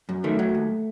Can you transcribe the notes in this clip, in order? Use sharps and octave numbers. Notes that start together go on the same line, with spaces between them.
F#2
D#3 A3
F#3
D#2